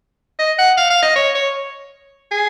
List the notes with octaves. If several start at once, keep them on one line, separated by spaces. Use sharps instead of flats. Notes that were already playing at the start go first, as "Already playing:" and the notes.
D#5
F#5
F5
F5
D#5
C#5
C#5
G#4